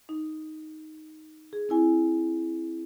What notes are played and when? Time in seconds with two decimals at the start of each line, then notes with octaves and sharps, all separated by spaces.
0.09 D#4
1.53 G#4
1.69 C4 E4 G#5